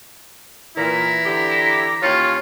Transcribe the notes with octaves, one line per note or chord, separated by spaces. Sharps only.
A#2 E3 E4 A#5
D3 G4
D#2 C#4 F4 C#5